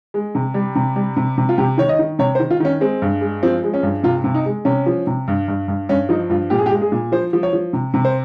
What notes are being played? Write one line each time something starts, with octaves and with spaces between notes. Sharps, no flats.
G#3
C3
G3
C3
G3
C3
C3
F4
C3 G4
D#3 C#5
D#5
D#3
C3 C#5
C5
D#3
F4
D#3 C#4
G#3 C4
G2
G#3
F3 C4
G#3
C#4
G2
C3 F4
C3
D#4
G#3
C3 C#4
F3
C3
G2
G2
G2
G2 C#4
F3 D#4
G2 F4
A#2 G4
G#4
G4
G#3
G#4
A#2
F3 C5
F3
C#5
F3
C3
C3
C5